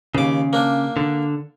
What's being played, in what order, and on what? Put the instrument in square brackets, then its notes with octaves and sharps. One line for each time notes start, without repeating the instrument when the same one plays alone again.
[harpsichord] D#2 D6 [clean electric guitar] C#3
[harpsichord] A#3 D4
[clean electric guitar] D3